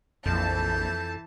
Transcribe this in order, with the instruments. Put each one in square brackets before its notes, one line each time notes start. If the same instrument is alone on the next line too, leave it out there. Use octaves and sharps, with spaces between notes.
[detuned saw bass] A#1 [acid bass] F2 [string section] E3 A5 [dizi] G6